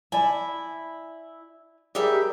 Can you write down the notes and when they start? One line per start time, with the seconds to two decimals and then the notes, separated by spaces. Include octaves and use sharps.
0.12 E4 D5 G#5 A5
1.95 G3 G4 G#4 A#4 E5